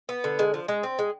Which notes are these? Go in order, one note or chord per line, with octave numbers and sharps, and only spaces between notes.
B3
D3
G#3
F3
G#3
C4
G#3